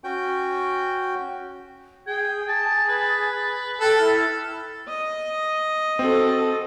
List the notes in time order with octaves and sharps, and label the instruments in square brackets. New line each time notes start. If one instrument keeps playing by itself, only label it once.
[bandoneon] C#4 F#4 G5 G6
[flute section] G#4 [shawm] G5 [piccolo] G#6
[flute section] G#4 [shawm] A5 [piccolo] A6
[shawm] B4
[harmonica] A4 [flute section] G5 [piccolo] F#6
[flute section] E4 [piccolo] F6
[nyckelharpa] D#5
[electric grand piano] C4 [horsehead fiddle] F#4 A4